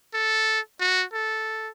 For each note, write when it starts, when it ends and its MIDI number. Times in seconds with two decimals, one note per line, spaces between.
0.14 0.60 69
0.80 1.04 66
1.13 1.69 69